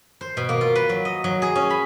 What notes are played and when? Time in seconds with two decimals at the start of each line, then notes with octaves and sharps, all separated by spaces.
0.21 C5
0.37 B2
0.49 A#3
0.61 F4
0.75 B4
0.89 F#3
1.05 D#5
1.24 F#3
1.42 G#4
1.55 C#4
1.70 B5